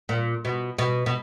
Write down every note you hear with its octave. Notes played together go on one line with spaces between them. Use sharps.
A#2
B2
B2
B2